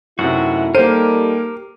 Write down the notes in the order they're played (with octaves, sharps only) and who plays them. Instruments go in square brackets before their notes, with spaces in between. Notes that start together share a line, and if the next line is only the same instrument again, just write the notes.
[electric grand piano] F#2 C3 [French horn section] A3 D#4 E4 [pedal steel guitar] F#4 F#5
[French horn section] G3 D#4 A4 [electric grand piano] A#3 D#7 [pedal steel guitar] G4 A#4 [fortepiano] C5